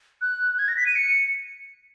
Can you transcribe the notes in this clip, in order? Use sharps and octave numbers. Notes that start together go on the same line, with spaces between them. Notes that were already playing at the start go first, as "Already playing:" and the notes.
F#6
G#6
A#6
B6
D#7
C#7